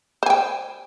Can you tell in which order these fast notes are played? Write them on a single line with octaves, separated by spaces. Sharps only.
C5 G#5 G5